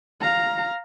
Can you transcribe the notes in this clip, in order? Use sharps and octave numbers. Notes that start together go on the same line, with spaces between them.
F5 A#5